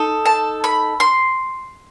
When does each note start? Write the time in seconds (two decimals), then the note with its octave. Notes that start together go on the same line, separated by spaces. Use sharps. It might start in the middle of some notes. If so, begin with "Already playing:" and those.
Already playing: D#4 A4
0.26 A5
0.64 B5
1.00 C6